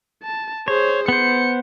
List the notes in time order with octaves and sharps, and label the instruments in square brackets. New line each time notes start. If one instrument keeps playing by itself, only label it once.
[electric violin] A5
[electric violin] G#4 C5 [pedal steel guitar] C#5
[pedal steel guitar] B3 C5 [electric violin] C#7